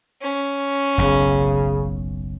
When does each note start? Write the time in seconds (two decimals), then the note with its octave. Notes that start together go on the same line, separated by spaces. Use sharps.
0.21 C#4
0.98 F#1 B1 C#3